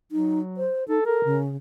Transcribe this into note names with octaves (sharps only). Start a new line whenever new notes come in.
F#3 D#4
C5
D#4 A4
A4 A#4
C#3